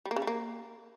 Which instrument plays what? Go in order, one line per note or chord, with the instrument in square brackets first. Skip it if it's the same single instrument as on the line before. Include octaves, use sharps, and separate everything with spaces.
[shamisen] G3
A#3
C#3
G3
A#3